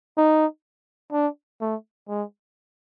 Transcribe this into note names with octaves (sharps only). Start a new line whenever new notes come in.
D#4
D4
A3
G#3